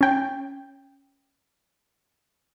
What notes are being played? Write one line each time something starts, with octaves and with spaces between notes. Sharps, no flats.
C#4 G5